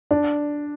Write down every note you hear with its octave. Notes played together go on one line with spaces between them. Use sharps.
D4